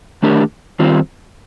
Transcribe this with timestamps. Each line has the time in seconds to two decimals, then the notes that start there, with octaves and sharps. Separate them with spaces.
0.23 D#3 A3 D4 G4 A#4
0.79 D#3 G3 C4 F4